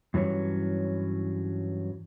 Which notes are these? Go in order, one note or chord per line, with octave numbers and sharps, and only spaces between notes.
G2 E3 F#3 C#4 C#5